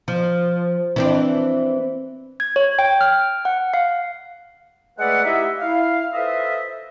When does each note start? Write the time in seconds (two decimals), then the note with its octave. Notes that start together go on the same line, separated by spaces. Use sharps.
0.08 F3
0.96 E3 C4 D4
2.40 G#6
2.56 C#5
2.79 G5
3.01 F6
3.45 F#5
3.74 F5
4.98 G#3 A3 B4 D5 E5 F#5
5.24 D#4 E4 G4 D#5 E5
5.59 E4 F5
6.13 F4 A4 B4 C5 D#5 E5